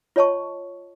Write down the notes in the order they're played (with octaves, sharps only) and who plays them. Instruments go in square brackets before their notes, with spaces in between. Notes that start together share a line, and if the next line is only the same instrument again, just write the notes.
[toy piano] F4 C#5 D#5 A5 C#6